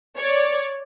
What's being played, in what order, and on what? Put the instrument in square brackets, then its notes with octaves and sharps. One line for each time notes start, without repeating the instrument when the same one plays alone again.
[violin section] C#5 D5